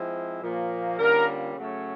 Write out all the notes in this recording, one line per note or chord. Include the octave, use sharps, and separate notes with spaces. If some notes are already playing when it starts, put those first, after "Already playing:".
Already playing: F3 G#3 C4 E4
A#2 F3 A#3
D3 G3 A#3 C#4 F4 A#4
C#3 F#3 A3 C#4